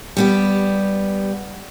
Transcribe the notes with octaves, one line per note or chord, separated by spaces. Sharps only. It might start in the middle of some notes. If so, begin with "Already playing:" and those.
G3 B3 G4